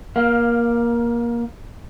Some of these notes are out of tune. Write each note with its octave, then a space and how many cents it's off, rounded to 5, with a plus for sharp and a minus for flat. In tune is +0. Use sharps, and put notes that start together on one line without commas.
A#3 +20 F5 +0